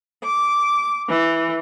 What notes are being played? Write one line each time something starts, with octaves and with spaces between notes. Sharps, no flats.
D6
E3